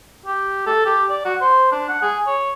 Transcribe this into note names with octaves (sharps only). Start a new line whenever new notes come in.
G4
A4
G4
D5
F#4
C5
D4
F#5
G#4
C#5